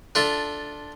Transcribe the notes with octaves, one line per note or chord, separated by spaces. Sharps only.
D4 F4 A4 E5